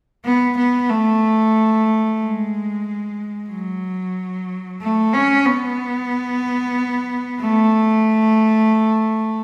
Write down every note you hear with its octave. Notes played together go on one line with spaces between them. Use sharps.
B3
B3
A3
G#3
F#3
A3
C#4
B3
A3